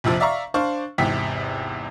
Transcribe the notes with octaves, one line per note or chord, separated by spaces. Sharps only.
A#1 F2 C3 F3
D5 E5 F5 A#5 C#6
D4 C5 F5 C#6
G#1 E2 C3 G5 B6